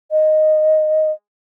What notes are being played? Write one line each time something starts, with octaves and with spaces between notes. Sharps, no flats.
D#5